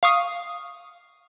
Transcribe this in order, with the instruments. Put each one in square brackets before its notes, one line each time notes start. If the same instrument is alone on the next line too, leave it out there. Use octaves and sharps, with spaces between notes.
[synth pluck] F5 C#6 D#6